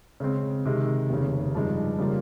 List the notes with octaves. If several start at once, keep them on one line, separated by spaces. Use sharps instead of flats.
C#3 G#3 C4
C3 D#3 G#3
F1 D#2 C#3
G2 F3 G#3 D#4
C#3 G3 A#3 F4